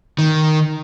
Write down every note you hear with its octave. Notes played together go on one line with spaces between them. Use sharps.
D#3